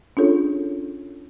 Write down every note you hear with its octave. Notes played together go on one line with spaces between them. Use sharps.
C#4 D4 F4 G#4 A4 C#5